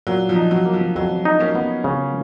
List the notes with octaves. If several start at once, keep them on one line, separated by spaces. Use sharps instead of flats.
A#2 F#3
F3
D#4
F#3
A#3
F3
F2 F#3
D#4
A#3 C#4
B3
C#3